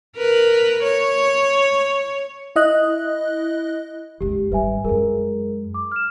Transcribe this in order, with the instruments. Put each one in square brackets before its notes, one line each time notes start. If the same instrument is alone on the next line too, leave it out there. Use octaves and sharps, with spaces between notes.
[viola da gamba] A#4 B4
C#5
[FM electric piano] E4 D#5 F#6
[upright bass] F#1 C#2 [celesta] G4
[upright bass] G#1 G3 [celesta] B4 E5 G#5
[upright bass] F#2 G#3 [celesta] G#4 A#4
[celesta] D6
F6 E7